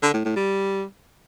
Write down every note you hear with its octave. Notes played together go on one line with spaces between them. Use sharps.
D3
A2
A2
G3